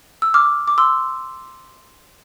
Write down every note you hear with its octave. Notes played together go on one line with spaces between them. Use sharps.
E6
D6 F6
D6
C6 E6